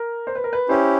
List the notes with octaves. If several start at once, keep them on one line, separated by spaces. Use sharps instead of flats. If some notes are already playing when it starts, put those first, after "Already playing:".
Already playing: A#4
C5
B4
A#4
B4
C#4 E4 G4 C5